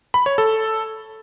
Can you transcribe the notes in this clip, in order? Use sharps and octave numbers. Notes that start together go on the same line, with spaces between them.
B5
C#5
A4